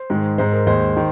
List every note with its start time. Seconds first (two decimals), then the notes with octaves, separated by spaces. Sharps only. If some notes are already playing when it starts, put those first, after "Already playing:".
Already playing: C5
0.10 G#2 D#3 G#3
0.38 G#2 G#3 C5
0.52 A#4
0.66 D#2 D#3 G#3 C5
0.97 D#3